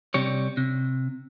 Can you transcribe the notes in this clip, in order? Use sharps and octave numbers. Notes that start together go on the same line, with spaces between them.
C3 G3 C#5
C3